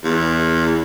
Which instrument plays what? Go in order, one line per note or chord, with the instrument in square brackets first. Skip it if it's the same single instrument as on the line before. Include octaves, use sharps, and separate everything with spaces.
[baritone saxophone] E2